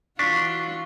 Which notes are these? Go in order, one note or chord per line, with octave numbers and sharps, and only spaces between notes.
E3 D4 F4 F#4 C#6 B6